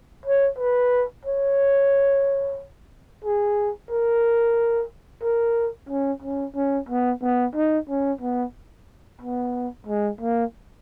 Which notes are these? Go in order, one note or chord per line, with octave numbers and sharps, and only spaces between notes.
C#5
B4
C#5
G#4
A#4
A#4
C#4
C#4
C#4
B3
B3
D#4
C#4
B3
B3
G#3
A#3